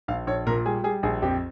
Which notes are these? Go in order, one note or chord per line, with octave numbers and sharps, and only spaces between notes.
A#1 F5
A#1 C#5
A#2 A#4
G3 G#4
G3 G#4
A#1 G#4
F2 G4